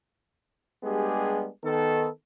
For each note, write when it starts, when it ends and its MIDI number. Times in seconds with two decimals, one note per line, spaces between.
0.83 1.47 55
0.83 1.47 56
0.83 1.47 59
0.83 1.47 62
0.83 1.47 67
0.83 1.47 68
1.64 2.07 51
1.64 2.07 59
1.64 2.07 69